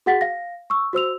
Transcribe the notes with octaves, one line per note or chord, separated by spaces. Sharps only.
F#4 G#4 F#5 A6 B6
F5 A#6
C#6 E6
F#4 C5 E6 F7